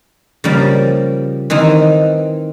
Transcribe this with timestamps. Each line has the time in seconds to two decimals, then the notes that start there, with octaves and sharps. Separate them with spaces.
0.44 C#3 F3 G3 A#3
1.50 D#3 E3 C4 D#4